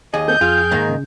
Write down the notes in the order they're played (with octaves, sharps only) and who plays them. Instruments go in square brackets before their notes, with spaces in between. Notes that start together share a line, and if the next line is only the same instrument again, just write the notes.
[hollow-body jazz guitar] D#2 G#4 [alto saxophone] D#5
[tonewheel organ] A#3 C4 A4 [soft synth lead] G6
[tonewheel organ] F2 G5 F6 [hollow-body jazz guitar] F4 [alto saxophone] G#4
[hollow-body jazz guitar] G#2 D#3 A#3
[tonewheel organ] C#3